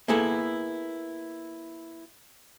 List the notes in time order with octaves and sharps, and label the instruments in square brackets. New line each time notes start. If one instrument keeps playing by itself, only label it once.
[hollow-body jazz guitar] A#3 B3 E4 G#4 A4